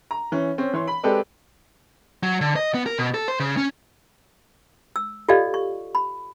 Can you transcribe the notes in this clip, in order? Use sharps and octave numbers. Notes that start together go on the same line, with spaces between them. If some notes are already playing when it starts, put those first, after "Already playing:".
A#5
E3 C#4
C4 C#4
E3 C#5 C6
B5
G#3 C4 G4 A4 B4 D5
F#3
D3
D#5
B3
A#4
B2
A4
C5
C#3
C#4
E6
F4 G4 A4 D5 D#5 F5
C#6
B5